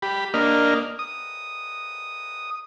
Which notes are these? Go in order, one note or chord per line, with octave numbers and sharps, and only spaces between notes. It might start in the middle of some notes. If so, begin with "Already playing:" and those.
G4 B5
A#3 D4 D#5 F6
D#6